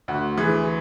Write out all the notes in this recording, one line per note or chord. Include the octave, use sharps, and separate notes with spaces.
D2 F#4
E3 G#4